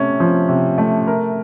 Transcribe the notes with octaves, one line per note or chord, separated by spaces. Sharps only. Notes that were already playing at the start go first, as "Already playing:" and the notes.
Already playing: C3 A3 C#4
F3
C3
A3
A#4